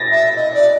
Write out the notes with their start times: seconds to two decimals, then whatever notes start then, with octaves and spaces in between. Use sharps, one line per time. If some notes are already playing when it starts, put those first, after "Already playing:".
Already playing: A6 A#6
0.12 E5
0.37 D#5
0.54 D5